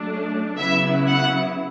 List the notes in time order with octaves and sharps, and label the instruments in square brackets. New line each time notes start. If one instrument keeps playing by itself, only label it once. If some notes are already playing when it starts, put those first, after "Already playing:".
Already playing: [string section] F#3 A3 D4
C#3 F#3 B3 E4 E5
F#5